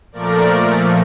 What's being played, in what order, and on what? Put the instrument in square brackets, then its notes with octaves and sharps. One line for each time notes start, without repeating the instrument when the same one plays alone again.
[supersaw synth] A#2 F3 A3 A#4 D5